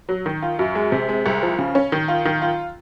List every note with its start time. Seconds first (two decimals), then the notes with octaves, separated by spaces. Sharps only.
0.09 F#3
0.26 D#3
0.43 F4
0.59 F#2
0.75 G#3
0.92 C3
1.09 G#3
1.26 C2
1.43 F3
1.59 C#3
1.75 C#4
1.92 D#3
2.08 F4
2.25 D#3
2.42 F4